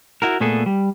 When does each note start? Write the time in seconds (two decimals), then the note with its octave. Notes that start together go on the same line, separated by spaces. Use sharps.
0.22 E4 F#4 A#4
0.40 A#2 A3 B3 G#4 A4
0.66 G3